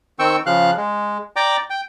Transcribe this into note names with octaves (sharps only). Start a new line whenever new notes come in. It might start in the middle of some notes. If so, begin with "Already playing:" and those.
D#3 C4 G5 C#6 E6
C#3 F3 F5 F#6
G#3
D5 G5 A#5 D6
G5